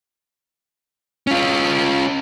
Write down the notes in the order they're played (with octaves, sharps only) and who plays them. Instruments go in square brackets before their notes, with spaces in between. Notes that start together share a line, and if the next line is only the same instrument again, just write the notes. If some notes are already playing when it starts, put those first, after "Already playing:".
[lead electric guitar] C#4 F4